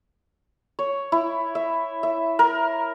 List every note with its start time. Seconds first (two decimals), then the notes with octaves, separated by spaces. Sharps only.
0.79 C#5
1.12 E4
1.55 E5
2.03 E5
2.39 A#4